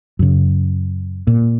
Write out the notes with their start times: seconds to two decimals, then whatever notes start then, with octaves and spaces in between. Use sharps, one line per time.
0.19 F#2 C#3
1.27 A#2